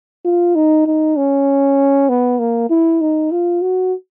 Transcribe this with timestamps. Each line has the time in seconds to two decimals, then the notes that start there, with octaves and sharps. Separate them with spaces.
0.25 F4
0.55 D#4
0.86 D#4
1.17 C#4
2.09 B3
2.39 A#3
2.70 E4
3.01 D#4
3.31 F4
3.62 F#4